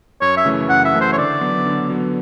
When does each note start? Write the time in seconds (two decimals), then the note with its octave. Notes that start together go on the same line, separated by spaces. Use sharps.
0.21 F#2 C#5
0.37 E5
0.45 C#3 E3 A3
0.69 F#2 F#5
0.85 E5
0.94 C#3 E3 A3
1.01 C5
1.12 C#5
1.17 D3 D5
1.41 F#3 B3
1.65 D3
1.90 F#3 B3